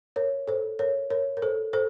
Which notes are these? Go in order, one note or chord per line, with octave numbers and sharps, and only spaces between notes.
A#4 C#5
A4 C5
A#4 C#5
A#4 C#5
A#4
A4 C5
A4 C5